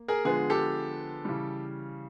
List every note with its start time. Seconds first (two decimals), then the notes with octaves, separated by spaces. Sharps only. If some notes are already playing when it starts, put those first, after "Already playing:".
Already playing: A#3
0.08 G#4 A#4
0.25 D3 F3 G#3 B3 G#4
0.50 G4 A4
1.25 C#3 E3 G3